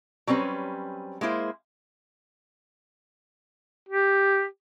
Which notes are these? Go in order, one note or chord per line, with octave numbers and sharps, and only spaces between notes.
F#3 G3 C4 C#4 B4
G#3 A#3 E4 C5
G4